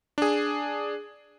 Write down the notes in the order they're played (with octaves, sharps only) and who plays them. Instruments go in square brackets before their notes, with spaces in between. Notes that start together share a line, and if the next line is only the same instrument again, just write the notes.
[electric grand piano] D4 G#4